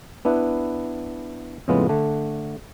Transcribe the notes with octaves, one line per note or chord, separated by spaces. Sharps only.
B3 D4 E4 B4
F2 A2 C#3 G#3 B3 F4
D3 A3 D4